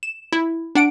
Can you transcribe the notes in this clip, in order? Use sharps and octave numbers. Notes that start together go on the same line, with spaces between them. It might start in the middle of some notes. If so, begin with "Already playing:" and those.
E7
E4
D4 F#5 D7